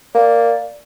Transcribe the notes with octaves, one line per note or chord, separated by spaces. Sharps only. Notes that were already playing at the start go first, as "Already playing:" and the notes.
A#3 D5